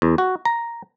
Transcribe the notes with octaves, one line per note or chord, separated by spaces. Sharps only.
E2
F#4
A#5